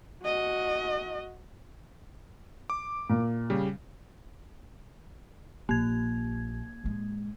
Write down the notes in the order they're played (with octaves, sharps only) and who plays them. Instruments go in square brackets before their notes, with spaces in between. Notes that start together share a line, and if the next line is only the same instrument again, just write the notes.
[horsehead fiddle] F#4 D#5
[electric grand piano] D6
[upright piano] A#2
[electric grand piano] C#3 G3
[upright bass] A#1 [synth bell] A#3 G#6
[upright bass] A2 G#3